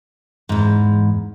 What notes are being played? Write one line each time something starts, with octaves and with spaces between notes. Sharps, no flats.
E2 G#2